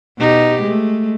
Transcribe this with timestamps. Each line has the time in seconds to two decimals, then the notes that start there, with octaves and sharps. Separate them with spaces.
0.18 B2 D#4 G4
0.62 G#3 A3